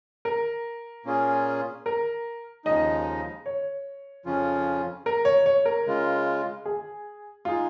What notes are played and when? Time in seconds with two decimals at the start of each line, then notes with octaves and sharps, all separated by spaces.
0.25 A#4
1.05 A#2 A#3 C#4 F4 G#4
1.86 A#4
2.65 D#2 C#3 F3 G#3 D#4 D#5
3.46 C#5
4.25 F2 C#3 F3 C#4 F4
5.06 A#4
5.25 C#5
5.46 C#5
5.65 A#4
5.86 C#3 G#3 F4
6.65 G#4
7.45 G#3 D#4 F4 G#4